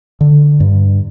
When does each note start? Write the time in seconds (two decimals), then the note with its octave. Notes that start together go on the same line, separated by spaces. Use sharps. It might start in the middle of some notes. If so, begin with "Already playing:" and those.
0.21 D3
0.60 G2